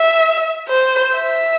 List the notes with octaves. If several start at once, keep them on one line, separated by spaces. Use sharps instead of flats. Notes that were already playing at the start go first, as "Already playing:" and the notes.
Already playing: E5
C5
E5